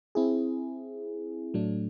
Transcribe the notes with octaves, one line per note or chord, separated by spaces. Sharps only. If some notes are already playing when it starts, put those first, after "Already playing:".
C4 E4 G#4
A2 F#3 A3 D4